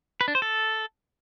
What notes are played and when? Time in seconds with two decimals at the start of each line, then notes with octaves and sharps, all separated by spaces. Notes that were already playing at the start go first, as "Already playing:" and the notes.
0.21 B4
0.28 D4
0.35 C5
0.42 A4